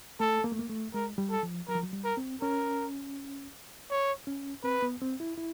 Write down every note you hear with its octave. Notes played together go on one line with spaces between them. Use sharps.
A3 A4
A#3
A3
A#3
A3
G#3 A#4
G3
A4
F3
F#3 A#4
F3
F#3
G3
A#4
C4
C#4 A#4
C#5
C#4
C4 B4
B3
C4
E4
E4